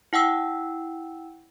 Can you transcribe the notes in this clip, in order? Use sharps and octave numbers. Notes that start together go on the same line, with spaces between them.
E4 F#5 G5 E6